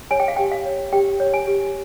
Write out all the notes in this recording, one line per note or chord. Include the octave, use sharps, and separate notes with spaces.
C#5 G#5
G5
F5
G4 G5
F5
C#5
G4 G5
C#5
G#5
G4